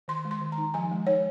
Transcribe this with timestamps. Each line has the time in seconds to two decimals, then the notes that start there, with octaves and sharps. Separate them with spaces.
0.08 D#3 C6
0.25 G#3
0.31 C6
0.41 D#3
0.52 A#5
0.58 D#4
0.74 F3 G#5
0.91 G#3
1.07 D#4 C#5